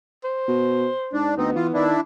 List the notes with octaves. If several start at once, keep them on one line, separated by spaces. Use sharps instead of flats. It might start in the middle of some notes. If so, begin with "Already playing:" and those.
C5
B2
G#2 D4
D2 B3 C4 D#4
E3 F4
D#3 D4 E4